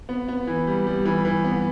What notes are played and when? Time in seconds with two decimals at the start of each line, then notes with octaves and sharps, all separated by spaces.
0.09 B3
0.28 B3
0.47 E3
0.67 G3
0.87 G3
1.05 E3
1.25 E3
1.44 B3